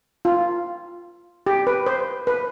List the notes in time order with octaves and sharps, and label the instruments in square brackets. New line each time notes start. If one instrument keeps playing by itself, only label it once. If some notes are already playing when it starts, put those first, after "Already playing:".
[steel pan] F4
G4
B4
C5
B4